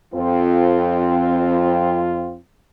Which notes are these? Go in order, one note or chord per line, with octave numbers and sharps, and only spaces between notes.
F2 C4 F4